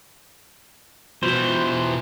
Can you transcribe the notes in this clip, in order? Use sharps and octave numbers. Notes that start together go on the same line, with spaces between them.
B2 E3 F4 F#4 C5